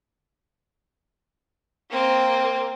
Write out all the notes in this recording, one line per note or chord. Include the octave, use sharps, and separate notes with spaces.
A#3 C4